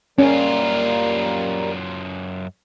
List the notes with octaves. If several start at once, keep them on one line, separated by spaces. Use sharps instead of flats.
F#2 G3 A#3 C#4 F4